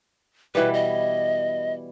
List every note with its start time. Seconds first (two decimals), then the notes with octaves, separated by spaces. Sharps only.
0.55 B2 E3 G3 B4
0.74 D#5